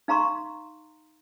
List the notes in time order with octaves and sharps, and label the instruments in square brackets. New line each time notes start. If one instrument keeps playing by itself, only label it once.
[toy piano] D#4 F5 A#5 C6 C#6